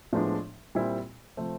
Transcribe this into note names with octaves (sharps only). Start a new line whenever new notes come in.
A2 F3 G#3 B3 D4
A#2 G3 C4 E4
C3 F3 A3 C4